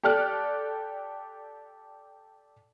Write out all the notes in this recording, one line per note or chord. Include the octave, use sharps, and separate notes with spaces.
G4 A4 D5 F6 F#6